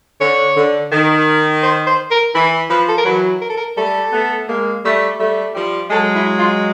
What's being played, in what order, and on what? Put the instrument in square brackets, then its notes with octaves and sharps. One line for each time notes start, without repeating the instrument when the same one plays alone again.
[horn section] D3 [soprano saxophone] C#5
[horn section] D3
D#3
[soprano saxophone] C5
C5
A#4
[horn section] E3 [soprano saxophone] B4
[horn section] F3 [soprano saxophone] B4
[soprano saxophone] A4
A#4
[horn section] E3 F#3 [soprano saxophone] B4
[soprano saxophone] A#4
A4
A#4
[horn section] G3 A3 [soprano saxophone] A4
[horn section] A3 B3
G#3 A#3
G3 A3
G3 A3
F3 G3
[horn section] F#3 G#3 [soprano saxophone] A4
[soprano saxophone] E4
F4